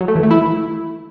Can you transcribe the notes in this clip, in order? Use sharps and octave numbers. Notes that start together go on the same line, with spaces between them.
F#3
A3
E3
A3
E4